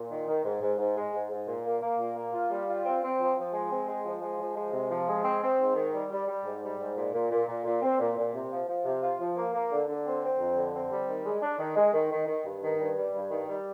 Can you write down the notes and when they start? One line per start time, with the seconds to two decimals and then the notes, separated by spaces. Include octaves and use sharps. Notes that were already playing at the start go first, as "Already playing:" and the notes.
Already playing: A#2
0.10 D#3
0.28 D#3
0.45 G#2
0.61 G#2
0.79 G#2
0.97 G#3
1.13 G#2
1.31 G#2
1.47 A#2
1.66 A#3
1.81 A#3
1.99 A#2
2.17 A#3
2.33 F4
2.51 G3
2.68 F4
2.85 C4
3.03 C4
3.20 F3
3.37 F3
3.53 G#3
3.71 C4
3.88 G#3
4.05 F3
4.22 G#3
4.40 F3
4.56 G#3
4.73 C3
4.91 F3
5.08 G#3
5.25 C4
5.42 C4
5.59 G#2
5.76 D#3
5.93 G3
6.11 G3
6.28 G3
6.44 G#2
6.63 G3
6.80 G#2
6.97 A#2
7.14 A#2
7.31 A#2
7.47 A#2
7.65 A#2
7.82 C4
7.99 A#2
8.17 A#2
8.33 C3
8.51 F3
8.68 F3
8.85 C3
9.02 F4
9.20 F3
9.37 A#3
9.54 A#3
9.71 D3
9.89 D3
10.06 C4
10.22 C4
10.39 F2
10.57 D3
10.74 C4
10.92 G3
11.09 D#3
11.26 G#3
11.42 D4
11.59 D#3
11.76 G#3
11.94 D#3
12.12 D#3
12.27 D#3
12.45 G2
12.63 D#3
12.79 G2
12.97 G3
13.14 G2
13.31 D#3
13.48 G3